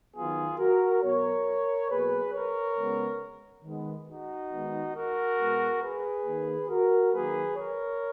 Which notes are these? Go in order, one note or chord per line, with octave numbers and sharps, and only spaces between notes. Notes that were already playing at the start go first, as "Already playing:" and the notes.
D#3 F#3 B3 F4 G#4
F#4 A#4
B2 F#3 B3 A#4 C#5
B2 F#3 A#3 G#4 B4
A#4 C#5
C#3 G#3 B3
D#3 G#3 B3
D#4 F#4
D#3 G#3 B3
F#4 A#4
B2 G#3 B3
G#4 B4
D#3 A#3
F#4 A#4
D#3 F#3 A#3 G#4 B4
A#4 C#5